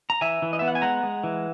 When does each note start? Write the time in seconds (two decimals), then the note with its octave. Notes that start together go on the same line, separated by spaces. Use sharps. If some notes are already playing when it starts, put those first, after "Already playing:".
0.10 A#5
0.21 E3 E5 G#5
0.42 E3
0.53 D#5
0.59 B3 E5
0.68 F#5
0.75 G#5
0.82 G#3 F#5 A#5
1.03 G#3
1.24 E3